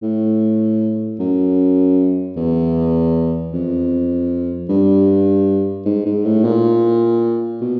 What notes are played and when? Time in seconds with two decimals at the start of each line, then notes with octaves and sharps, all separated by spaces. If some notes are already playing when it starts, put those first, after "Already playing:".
0.03 A2
1.19 F#2
2.36 E2
3.53 F2
4.69 G2
5.85 G#2
6.06 G#2
6.25 A2
6.45 A#2
7.61 B2